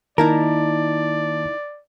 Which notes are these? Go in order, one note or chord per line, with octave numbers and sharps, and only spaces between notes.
D#3 A#3 D#4 E4 A#4 D5 A5